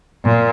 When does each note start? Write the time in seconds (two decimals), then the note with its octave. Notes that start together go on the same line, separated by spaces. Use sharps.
0.24 A#2